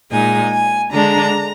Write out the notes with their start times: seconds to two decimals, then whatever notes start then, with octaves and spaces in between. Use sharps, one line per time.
0.10 A#2 G#3 D#4 G#5
0.51 G#5
0.91 D3 G#3 D4 A#5